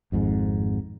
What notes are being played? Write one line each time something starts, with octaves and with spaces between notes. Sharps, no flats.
G#1 F2 G#2